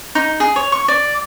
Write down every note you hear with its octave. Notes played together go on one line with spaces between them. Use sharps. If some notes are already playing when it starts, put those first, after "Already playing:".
D#4
G#4
C#5
C#6
D5